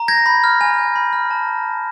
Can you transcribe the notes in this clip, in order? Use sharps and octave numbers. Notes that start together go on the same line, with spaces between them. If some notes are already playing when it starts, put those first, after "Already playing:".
Already playing: A#5
G6 G#6 A#6
B5
F6
G#5
G6
B5
F6
A5